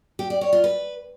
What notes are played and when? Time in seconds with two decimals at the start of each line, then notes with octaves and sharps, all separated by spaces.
0.19 G4
0.30 D5
0.41 C#5
0.53 F4
0.64 B4